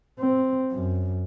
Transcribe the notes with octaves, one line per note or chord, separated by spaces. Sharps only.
C4
F#2